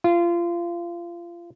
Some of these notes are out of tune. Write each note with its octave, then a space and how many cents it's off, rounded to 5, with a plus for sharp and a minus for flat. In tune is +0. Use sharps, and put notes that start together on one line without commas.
F4 -25